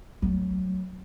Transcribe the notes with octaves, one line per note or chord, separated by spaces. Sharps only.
F#3 A3